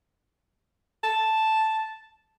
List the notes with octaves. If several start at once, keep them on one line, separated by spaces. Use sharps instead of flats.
A5